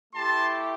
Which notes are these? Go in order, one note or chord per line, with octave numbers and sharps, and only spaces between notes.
A3 E4 G4 A5 C6